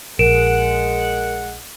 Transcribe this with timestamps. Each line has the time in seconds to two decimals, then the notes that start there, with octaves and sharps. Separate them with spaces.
0.19 A#1 G#3 G#4 A#4 F#5 D7 E7